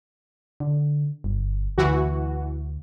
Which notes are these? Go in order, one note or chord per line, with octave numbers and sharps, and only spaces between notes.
D3
G1
D2 E3 F#4